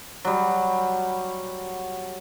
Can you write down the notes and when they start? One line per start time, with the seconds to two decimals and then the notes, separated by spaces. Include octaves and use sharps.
0.25 F#3 G3